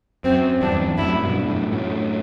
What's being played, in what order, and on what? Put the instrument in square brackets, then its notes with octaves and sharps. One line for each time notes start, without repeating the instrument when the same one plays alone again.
[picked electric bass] F#2 [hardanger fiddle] C4
[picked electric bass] E2 G2 [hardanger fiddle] D4
[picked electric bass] F#2 A2 [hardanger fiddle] E4
[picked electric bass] G2 B2
F#2 A2
F#2 A2